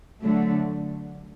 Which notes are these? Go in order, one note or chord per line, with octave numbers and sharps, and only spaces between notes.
D3 F#3 A3